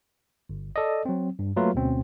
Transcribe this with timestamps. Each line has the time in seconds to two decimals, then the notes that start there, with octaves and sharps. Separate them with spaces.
0.49 G1
0.76 A4 D5 D#5
1.05 F#3 C4
1.39 G2
1.56 F#3 A3 A#3 F4 B4
1.75 D2 B2 C4 C#4